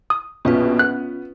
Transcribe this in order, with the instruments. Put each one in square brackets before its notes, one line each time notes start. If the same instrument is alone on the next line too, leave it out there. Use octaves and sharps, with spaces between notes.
[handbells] D#6
[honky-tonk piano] A#1 B2 [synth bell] C#4 F4 B4
[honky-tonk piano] B3 [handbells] F#6